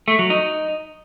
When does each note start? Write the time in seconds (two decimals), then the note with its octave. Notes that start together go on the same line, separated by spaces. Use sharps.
0.08 A3
0.19 F#3
0.30 D#4